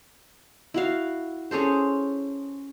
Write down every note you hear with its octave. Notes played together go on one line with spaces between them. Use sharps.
E4 F#4 F5
C#4 G#4 A4 C5